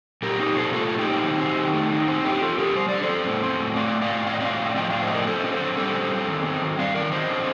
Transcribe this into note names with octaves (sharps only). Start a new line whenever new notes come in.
A#2 G4 A#4
C4 D#4 G4
A#2 A4 C5
A3 F4 A4
A#2
D#4 G4
C4
D#3
C4
D#3
A3
D#3
C4
D3 D#4 G4
C4 F4 A4
D3 G4 A#4
G3 C5
D3 D5
A4 C5
C4
A2
C4
A2
A3 D5 F5
A2
D5 F5
C4
A2 F5
D#5
C4 D5 F5
A2
F3 D#5 G5
A2 D5 F5
C5 D#5
C4 A#4 D5
D3 A4 C5
C4
A4 C5
D3
G3 A4 C5
D3
C4
D#3
C4
D#3
G3 D5 F5
D#3 A#4 D5
C4 C5 D#5
D3